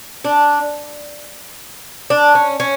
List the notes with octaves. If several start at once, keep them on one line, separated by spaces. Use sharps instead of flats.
D4
D4
C#4
C#4